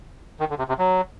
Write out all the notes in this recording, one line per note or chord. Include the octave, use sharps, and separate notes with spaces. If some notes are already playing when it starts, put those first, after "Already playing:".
D#3
D3
C3
C3
F#3